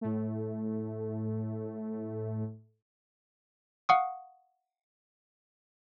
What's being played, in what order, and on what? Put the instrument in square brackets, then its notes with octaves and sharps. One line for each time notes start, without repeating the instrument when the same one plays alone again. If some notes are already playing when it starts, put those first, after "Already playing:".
[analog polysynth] A2 A3
[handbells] F5 F#5 C#6 D#6